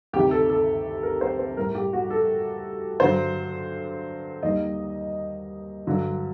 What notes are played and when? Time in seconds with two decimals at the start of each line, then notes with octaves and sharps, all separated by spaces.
0.13 D2 C3 D#3 G4
0.31 A4
0.50 A4
1.03 A#4
1.21 C5
1.39 C5
1.56 A2 G3 A#4
1.75 G4
1.93 F#4
2.10 A4
3.00 G2 D3 F#3 C5
4.43 D#2 D#3 G3 D#5
5.87 G2 D3 F#3